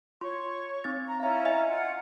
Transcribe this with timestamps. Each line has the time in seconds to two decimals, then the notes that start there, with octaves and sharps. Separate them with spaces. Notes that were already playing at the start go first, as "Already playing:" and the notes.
0.21 F4 C#5 C6 C#6
0.84 C4 D#4 A6
1.06 A#5
1.20 C#4 E4 E5 F5 A#5
1.45 D#5 E5 G#5
1.68 F4 F#5